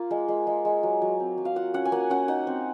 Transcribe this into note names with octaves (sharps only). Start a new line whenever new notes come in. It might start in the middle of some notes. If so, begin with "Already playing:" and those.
Already playing: A#3 F4
G#3
G#3
G#3
G#3
F#3
F#3
C4
F#3
F5
F4 F#5
C#4 F#5
G#5
A#3 F#5
C#4 F#5
D#4 F#5
C4